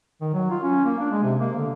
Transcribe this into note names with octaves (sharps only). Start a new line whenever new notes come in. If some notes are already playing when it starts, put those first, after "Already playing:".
D#3
F#3
F4
C#4
A#3
D4
G#3
C3
A#3
D3